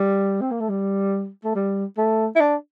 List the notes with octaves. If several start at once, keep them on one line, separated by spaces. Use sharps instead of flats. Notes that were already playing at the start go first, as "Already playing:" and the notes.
Already playing: G3
C4
A#3
A3
G3
A3
G3
A3
E4
D4